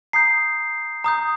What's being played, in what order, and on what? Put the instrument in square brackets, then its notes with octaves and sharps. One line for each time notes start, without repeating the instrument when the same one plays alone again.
[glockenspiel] A#5 D#6 G6 C7
A#5 D#6 G6